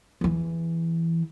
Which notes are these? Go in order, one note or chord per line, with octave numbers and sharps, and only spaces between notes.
E2 E3